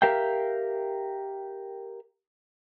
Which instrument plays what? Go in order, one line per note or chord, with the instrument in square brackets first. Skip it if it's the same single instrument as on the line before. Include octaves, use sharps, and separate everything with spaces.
[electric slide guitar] G4 A#4 E5 F5 G5